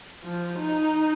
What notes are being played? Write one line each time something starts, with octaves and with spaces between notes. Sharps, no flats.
F3
D#4